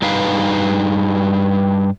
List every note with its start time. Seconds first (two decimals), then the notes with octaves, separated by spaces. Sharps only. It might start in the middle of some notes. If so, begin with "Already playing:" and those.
0.02 G2 D#4 B4 F5